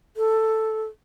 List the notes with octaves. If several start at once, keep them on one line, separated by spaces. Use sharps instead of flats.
A4